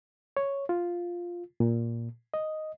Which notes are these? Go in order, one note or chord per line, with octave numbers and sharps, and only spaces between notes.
C#5
F4
A#2
D#5